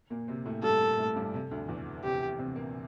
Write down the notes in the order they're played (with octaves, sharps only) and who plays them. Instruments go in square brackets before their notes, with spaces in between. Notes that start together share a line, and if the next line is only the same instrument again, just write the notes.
[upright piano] A#2 A#3
C3 C4
A2 A3
[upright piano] G2 G3 [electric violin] A4
[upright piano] A#2 A#3
A2 A3
G2 G3
C3
D2 D3
E2 E3
[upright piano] C3 C4 [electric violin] G4
[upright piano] C3 C4
A#2 A#3